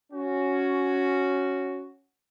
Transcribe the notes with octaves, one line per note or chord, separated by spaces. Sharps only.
C#4 F#4